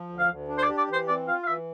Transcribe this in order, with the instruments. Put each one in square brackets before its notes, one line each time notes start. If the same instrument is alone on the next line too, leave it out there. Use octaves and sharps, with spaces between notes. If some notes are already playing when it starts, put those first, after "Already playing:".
Already playing: [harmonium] F3
D2
[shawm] F5
[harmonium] D2
D4
[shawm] C5
D5
[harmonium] G4
[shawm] D5
[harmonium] E3 [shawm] C5
[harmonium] C4 [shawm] D5
[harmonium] F4 [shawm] F5
[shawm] F5
[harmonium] E3 [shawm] E5